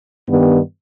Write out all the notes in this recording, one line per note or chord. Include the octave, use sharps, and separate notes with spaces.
G2 D#3 G3 B3